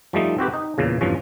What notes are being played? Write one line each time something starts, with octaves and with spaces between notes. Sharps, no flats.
F3 G3 A3 D#4
C4 F#4 G4 B4
D#4
E2 A#2 C#3
E2 G2 F3 C#4